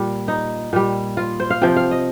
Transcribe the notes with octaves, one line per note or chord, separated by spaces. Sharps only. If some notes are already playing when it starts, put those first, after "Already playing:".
Already playing: A#2 G3
D#4
A#2 G3
F4
C5
F5
C3 F3 G5
F5
D#5